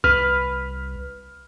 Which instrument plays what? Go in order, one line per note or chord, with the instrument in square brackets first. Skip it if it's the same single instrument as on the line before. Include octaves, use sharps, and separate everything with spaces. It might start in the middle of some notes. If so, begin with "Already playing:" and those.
[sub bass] C2 [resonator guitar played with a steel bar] B4 [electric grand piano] F6